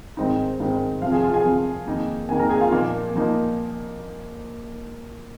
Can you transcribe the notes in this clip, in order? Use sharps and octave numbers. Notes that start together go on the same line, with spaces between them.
G#2 D#3 G#3 C4 D#4
G#2 D#3 G#3 C4 D#4
F2 C3 F3 F4 F5
G#4 G#5
F4 F5
G#4 G#5
F2 C3 F3
F2 D#3 A#3 D#4
F2 D#3 A#3 D#4 G#4 G#5
A#4 A#5
G#4 G#5
F4 F5
A#2 F3 A#3 D#4
A#2 F3 A#3 D#4